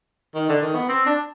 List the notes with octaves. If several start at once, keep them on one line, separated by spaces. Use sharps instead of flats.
D#3
D3
D#3
B3
C4
D4